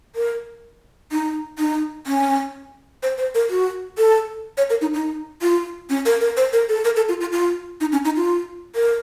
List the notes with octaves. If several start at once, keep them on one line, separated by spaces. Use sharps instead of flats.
A#4
D#4
D#4
C#4
C5
C5
A#4
F#4
A4
C#5
A#4
D#4
D#4
F4
C#4
A#4
A#4
C5
A#4
A4
A#4
A4
F4
F4
F4
D#4
C#4
D#4
F4
A#4